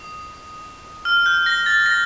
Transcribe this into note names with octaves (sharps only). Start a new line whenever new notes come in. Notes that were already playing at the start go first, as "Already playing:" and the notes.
Already playing: D#6
F6
G6
A#6
A6
A#6